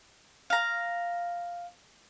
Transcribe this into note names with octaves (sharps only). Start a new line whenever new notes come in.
F5 A#5